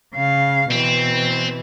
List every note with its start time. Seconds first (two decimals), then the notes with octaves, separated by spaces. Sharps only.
0.14 C#3 F5
0.71 B2 E3 C4